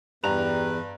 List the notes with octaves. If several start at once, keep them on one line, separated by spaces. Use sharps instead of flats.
E2 G2 G3 B4 A#5 F7